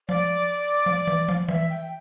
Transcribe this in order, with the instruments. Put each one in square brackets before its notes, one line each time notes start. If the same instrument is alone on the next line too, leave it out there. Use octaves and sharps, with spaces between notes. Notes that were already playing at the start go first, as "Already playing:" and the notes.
[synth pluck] F3 [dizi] D5
[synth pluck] F3
E3
F3
[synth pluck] E3 [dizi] E5
[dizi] G5